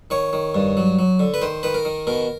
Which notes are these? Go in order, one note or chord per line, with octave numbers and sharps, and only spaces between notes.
D#3 C#5
D#3
G2
F#3
F#3
D3
B4
D#3 C5
D#3 B4
A#4
D#3
B2 A#4